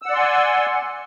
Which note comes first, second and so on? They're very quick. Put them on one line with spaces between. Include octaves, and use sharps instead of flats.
E6 F#5 D5 C6 G#5